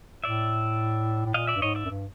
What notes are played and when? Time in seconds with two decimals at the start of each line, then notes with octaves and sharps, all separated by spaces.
0.24 A2 D5 E5
1.25 A2
1.34 A#2 D#5 F5
1.47 D5 E5
1.56 G2
1.62 G#2 C#5 D#5
1.75 D5 E5
1.85 F#2
1.89 G2